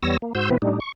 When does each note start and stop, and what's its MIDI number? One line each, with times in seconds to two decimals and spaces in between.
0.03 0.17 40
0.03 0.17 55
0.03 0.17 59
0.03 0.17 73
0.03 0.17 88
0.03 0.17 94
0.22 0.33 58
0.35 0.50 44
0.35 0.50 66
0.35 0.50 72
0.35 0.50 88
0.35 0.50 91
0.50 0.58 47
0.50 0.58 52
0.50 0.58 59
0.50 0.58 60
0.50 0.58 71
0.62 0.80 45
0.62 0.80 55
0.62 0.80 62
0.62 0.80 63
0.80 0.92 85